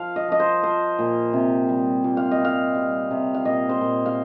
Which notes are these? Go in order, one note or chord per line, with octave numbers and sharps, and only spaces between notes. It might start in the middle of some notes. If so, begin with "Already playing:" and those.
Already playing: F3 F5
D#5
F3 D#5
C5
F3 C5
A#2
C3
G3
A#2
F5
D#5
G3 F5
G3
C3
F5
A#2 D#5
C5
A#2
F5